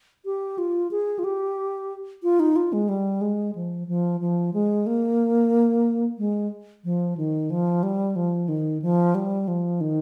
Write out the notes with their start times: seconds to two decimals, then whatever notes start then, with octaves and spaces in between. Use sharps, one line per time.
0.25 G4
0.58 F4
0.91 G#4
1.19 F4
1.24 G4
2.23 F4
2.40 D#4
2.56 F4
2.73 G#3
2.89 G3
3.21 G#3
3.55 F3
3.88 F3
4.21 F3
4.54 G#3
4.86 A#3
6.18 G#3
6.84 F3
7.18 D#3
7.50 F3
7.83 G3
8.16 F3
8.48 D#3
8.82 F3
9.15 G3
9.48 F3
9.81 D#3